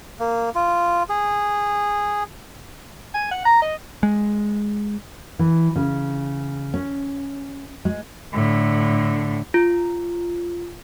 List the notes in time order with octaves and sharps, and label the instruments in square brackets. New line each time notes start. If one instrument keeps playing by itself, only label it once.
[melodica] A#3
F4
G#4
[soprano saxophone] G#5
F#5
A#5
D#5
[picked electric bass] G#3
[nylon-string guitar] E3
C#3
C#4
G#3
[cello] A2 D3
[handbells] F4